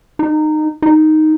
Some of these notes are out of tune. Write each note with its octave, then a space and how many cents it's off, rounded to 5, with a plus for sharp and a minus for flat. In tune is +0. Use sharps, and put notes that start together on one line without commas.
D#4 -20
D#4 +0